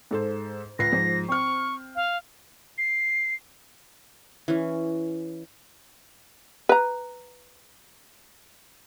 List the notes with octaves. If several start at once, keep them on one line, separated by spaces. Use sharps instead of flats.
G#2 A4 C5
C#2 B4 A#6 C7
G#2 F3
C4 C#6 F6
F5
C7
E3 C#4
B4 A#5